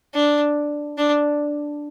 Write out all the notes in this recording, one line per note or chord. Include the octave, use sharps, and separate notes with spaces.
D4
D4